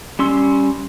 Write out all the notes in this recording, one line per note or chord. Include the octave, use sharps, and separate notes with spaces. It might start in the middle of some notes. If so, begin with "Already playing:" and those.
G3 C#4 C6 E6